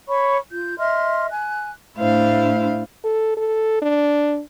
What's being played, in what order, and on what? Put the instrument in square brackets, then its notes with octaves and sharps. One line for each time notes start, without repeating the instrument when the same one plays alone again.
[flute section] C#5 B5 C#6
F4 G6
D#5 E5 C6 F6
G#5 F#6
[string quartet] A2 A3 D4 E4 C5 F5
[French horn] A4
A4
D4